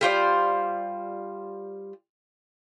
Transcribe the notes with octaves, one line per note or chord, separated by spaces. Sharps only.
G3 F4 C5 D5